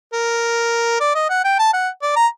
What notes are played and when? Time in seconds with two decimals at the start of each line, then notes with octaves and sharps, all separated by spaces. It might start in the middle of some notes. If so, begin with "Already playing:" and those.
0.13 A#4
1.00 D5
1.15 D#5
1.30 F#5
1.44 G5
1.59 A5
1.74 F#5
2.02 D5
2.16 A#5